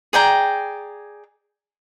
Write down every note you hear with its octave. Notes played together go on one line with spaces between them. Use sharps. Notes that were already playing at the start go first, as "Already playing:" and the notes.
G#4 D5 G5 A#5